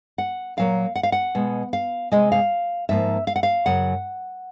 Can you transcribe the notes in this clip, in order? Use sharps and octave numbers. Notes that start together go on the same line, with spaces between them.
F#5
A#2 F#3 A#3 F5
F#5
F5
F#5
B2 G#3
F5
C3 E3 G#3 D#5
F5
G#2 F3 A#3 E5
F5
F#5
F5
F#2 C#3 F#3 F#5